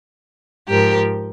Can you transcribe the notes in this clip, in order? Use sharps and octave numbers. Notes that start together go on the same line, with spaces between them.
G#2 F3 G4 A#4